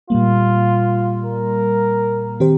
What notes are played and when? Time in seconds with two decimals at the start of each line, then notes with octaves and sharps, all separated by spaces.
0.10 A#2 G3 A#3 F4
1.24 A#4
2.40 D#3 C4 G4 C5